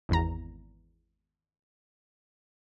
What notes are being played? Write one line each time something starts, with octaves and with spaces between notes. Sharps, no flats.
G#1 E2 A#5